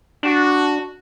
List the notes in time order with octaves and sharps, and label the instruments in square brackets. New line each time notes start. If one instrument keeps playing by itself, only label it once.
[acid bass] D4 [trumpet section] F#4